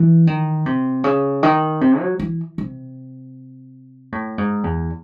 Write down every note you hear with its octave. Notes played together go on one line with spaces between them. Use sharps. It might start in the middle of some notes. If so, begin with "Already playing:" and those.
Already playing: E3
D#3
C3
C#3
D#3
C3
F#3
E3
C3
A2
G#2
E2